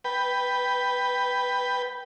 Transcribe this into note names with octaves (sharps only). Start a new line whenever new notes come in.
B4 G5